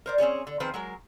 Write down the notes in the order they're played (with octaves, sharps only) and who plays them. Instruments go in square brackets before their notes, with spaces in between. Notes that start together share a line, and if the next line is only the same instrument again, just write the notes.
[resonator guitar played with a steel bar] A#4 C5 D5
C4 C#4 G#4 C#5
D3
D#3 F3 C4 G#4 B4 C5
F#3 G#3 A#4